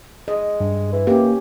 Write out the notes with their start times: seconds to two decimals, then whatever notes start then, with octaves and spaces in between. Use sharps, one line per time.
0.28 G#3 D#5
0.60 G2
0.93 E3
1.07 A#3 C#4 G4